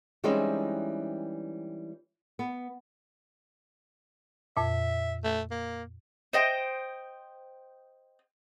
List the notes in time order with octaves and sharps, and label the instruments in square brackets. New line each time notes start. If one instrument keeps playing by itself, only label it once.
[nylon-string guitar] E3 G3 G#3 C4 C#4 D#4
B3
[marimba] F2 A#2 [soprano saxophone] E5
[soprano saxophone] A3
A#3
[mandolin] C5 D#5 G5